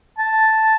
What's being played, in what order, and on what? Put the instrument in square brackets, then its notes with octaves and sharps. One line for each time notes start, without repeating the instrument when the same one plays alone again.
[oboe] A5